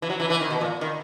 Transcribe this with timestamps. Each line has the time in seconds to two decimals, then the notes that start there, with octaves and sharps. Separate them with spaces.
0.02 E3
0.10 F#3
0.20 E3
0.30 E3
0.40 D#3
0.50 B2
0.61 A#2
0.81 D#3